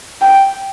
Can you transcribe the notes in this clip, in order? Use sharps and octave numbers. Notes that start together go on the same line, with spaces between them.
G5